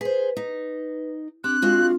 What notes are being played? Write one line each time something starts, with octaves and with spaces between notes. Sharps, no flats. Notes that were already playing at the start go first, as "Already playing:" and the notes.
G#4 B4 C5
D#4 B4
C4 D4 G4 F#6
G#3 F4 F#4 F5